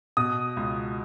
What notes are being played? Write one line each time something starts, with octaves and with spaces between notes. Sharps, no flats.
B2 D#6
C#2